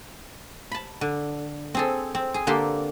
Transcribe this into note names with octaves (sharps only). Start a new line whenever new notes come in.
A5 B5
D3
C4 G#4 A4
C4
G#4
D3 A#3 G4 A4 C6